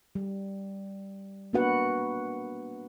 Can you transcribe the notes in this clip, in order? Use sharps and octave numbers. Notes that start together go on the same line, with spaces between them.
G3
A#3 B3 D4 F#4 B4 F#5